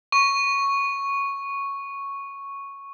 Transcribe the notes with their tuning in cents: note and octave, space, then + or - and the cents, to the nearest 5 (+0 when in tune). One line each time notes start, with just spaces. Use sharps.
C#6 +0